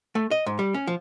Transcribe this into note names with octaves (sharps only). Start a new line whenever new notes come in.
A3
D#5
G#2
G3
C#4
F3